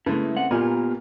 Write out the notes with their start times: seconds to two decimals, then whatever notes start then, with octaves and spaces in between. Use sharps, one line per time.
0.06 C#3 G#3 A3 E4 B4
0.36 C4 F#5
0.51 A#2 B3 F4 G4 A#4 G#5